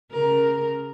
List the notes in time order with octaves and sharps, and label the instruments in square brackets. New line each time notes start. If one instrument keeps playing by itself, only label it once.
[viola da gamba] C#3 A#4